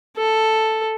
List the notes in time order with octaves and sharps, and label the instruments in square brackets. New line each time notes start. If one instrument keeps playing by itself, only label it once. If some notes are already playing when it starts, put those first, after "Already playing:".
[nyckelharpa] A4